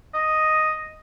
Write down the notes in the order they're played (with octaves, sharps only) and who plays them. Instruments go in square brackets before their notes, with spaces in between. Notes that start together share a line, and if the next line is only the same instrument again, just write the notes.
[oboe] D#5